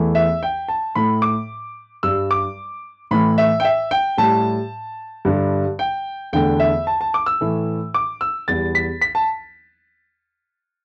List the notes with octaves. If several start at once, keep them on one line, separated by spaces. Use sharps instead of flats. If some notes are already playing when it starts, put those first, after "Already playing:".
Already playing: E2 E3 A3
E5
G5
A5
A2 A3 B5
D6
G2 G3 E6
D6
A2 E3 A3 B5
E5
G5
E5
G5
A2 G3 A5
G2 D3 G3
G5
E2 D3 A3 G5
E5
A5
A5
D6
E6
A2 E3 A3
D6
E6
E2 E3 G3 A6
B6
B6
A5